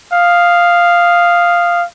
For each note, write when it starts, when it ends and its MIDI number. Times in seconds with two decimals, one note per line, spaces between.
0.13 1.83 77
0.13 1.83 87